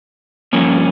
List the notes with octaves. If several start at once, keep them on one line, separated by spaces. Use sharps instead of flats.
G2 F3 A#3 C#4